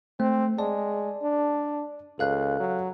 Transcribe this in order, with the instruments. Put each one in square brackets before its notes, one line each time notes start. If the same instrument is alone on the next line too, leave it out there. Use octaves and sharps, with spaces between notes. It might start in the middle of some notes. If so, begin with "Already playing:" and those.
[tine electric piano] A3 [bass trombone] C4
[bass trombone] G#3 [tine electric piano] D5 A5
[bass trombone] D4
[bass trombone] C#2 [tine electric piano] A4 F5 F#6
[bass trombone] F#3